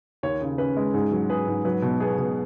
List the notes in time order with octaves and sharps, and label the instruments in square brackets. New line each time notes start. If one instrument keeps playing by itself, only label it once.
[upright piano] D#2 [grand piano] C#5
[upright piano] C#3
[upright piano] C#4 [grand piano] B4
[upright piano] G#3
[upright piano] G#2 [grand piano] G#4
[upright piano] F#3
[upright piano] G#4 [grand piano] B4
[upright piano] G#2
[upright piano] F#3 [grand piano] B4
[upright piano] B2
[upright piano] B3 [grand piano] G#4
[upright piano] B2